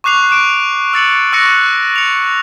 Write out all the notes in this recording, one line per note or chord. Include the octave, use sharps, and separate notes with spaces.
C#6 D6 F#6 C7 F7
C#6 D6 D7 E7
E6 A6 C#7 F#7
C#6 E6 F#6 A#6 C#7
C#7 F7